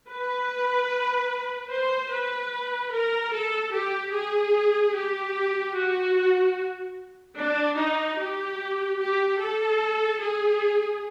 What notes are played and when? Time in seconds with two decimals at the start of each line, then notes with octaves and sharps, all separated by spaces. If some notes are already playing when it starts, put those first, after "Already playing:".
0.10 B4
1.71 C5
2.11 B4
2.92 A#4
3.33 A4
3.73 G4
4.14 G#4
4.95 G4
5.75 F#4
7.37 D4
7.77 D#4
8.18 G4
8.99 G4
9.39 A4
10.20 G#4